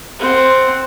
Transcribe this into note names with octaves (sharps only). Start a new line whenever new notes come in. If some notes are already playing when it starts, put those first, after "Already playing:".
C4 F#5